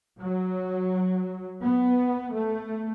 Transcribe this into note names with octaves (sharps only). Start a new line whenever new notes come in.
F#3
B3
A3